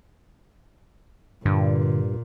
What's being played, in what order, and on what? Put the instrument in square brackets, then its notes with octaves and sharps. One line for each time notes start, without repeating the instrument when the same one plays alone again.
[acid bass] G2 [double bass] A#2 [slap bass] D3